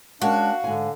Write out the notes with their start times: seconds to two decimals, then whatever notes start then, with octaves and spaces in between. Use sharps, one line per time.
0.22 G#3 C#4 D4 F#4 A#4 F5
0.64 G#2 D3 G#5